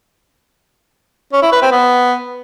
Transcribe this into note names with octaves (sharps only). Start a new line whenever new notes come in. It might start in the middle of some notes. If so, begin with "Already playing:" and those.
C#4
E4
B4
C4
B3